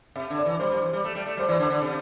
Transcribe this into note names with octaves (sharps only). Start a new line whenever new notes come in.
C3 E5
D3
D5
E3
G3 C5
G3
E3
G3
A3
G3
A3
G3 C5
E3 D5
D3
D3
C3